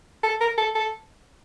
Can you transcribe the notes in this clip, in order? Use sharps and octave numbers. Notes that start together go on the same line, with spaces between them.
A4
A#4
A4
A4